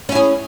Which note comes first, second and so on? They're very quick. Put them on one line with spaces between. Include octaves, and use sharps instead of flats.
C#4 E4 G#4